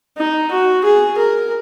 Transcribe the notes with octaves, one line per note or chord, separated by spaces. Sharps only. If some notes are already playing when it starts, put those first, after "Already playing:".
D#4
F#4
G#4
A#4